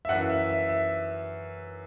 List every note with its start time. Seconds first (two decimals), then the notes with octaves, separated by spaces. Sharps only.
0.05 E5
0.09 F#2 F#5
0.12 E3
0.30 E5
0.50 E5
0.69 E5